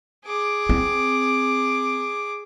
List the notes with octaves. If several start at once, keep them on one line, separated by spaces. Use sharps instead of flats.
G#4 D6
C4